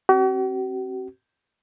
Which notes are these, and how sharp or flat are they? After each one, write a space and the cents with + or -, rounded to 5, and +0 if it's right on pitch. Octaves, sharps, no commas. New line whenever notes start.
C4 +30 F#4 +45